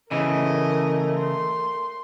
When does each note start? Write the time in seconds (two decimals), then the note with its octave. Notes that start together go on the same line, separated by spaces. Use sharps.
0.11 C#3 E3 A3 A#4 D#5
1.18 C6